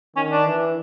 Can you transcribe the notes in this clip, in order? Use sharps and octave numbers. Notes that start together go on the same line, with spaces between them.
D#3 C#4
D4
E3